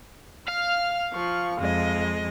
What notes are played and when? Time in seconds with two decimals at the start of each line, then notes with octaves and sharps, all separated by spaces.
0.48 F5 F6
1.13 F3 C#6
1.58 F2 G#3 D#5